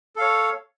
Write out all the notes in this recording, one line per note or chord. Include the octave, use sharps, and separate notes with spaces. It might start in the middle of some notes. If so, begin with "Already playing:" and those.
A4 C#5 F5